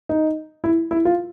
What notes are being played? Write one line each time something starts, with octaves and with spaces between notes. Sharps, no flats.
D#4
E4
E4
F4